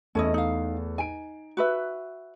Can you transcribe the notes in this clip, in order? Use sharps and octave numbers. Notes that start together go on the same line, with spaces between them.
E2 A3 C#4 E4 A4 D#5
D#4 F5
D#4 G#5 D7
F#4 B4 E5